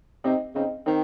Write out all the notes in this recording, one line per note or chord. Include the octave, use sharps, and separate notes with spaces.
C3 C4 D#4
C#3 C4 D#4
D#3 C4 D#4